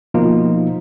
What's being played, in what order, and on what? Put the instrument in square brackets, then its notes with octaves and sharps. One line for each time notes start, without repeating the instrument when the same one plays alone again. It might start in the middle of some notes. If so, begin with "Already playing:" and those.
[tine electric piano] B2 F3 A#3 D#4 F4